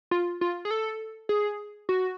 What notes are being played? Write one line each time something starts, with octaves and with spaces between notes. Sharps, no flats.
F4
F4
G#4
A4
G#4
F#4